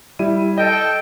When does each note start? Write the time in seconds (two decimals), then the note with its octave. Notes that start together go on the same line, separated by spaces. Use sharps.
0.19 G3 E4 D#7
0.58 A4 D#5 G5